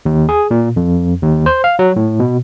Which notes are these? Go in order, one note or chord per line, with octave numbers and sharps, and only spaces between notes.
D#2
G#4
A#2
F2
D#2
C5
F5
F#3
A2
B2